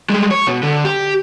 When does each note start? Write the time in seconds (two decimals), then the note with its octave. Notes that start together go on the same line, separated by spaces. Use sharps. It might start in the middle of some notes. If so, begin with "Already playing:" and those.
0.10 G3 G#3
0.31 C#5
0.47 B2
0.63 D3
0.85 G4